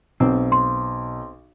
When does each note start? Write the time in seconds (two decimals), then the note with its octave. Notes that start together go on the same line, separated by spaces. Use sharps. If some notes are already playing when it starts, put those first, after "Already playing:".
0.20 B1 C4
0.52 C6